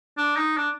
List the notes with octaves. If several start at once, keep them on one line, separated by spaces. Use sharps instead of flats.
D4
D#4
D4